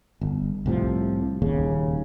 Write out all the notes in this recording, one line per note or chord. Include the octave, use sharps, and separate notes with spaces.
G1
C2 A2 C3 F3
D#1 D#2 C#3